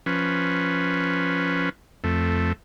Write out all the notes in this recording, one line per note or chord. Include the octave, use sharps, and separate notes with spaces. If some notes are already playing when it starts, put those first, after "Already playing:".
F3 C#4 B4
F2 A3